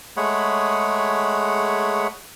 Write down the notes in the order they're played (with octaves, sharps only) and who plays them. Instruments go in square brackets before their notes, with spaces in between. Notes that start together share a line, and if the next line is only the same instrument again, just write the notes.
[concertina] G#3 A3 G#4 C#5 F#5 B5